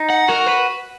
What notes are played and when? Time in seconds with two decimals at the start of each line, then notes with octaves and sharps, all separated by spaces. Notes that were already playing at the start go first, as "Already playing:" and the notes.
Already playing: D#4
0.10 F#5
0.28 F#4 A#4
0.47 B4